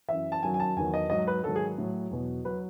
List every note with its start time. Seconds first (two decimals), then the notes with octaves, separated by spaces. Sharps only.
0.09 F#2 E3 E5
0.32 A5
0.43 F#2 D#3 F#3 G#5
0.54 G#5
0.60 A5
0.77 E2 D#3 F#3 G#5
0.94 D#5
1.10 G#2 F#3 D#5
1.27 B4
1.43 G#2 D#3 F#3 A4
1.56 G#4
1.78 A2 F#3
2.11 E2 B2 F#3
2.45 F#3 B4